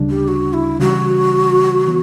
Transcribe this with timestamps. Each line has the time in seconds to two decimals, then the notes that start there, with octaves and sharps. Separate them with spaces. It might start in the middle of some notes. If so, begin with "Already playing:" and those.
Already playing: D2 C#3 G3 D4
0.10 G4
0.28 F#4
0.54 E4
0.80 C#3 E3 G3 F#4
1.87 E3 B3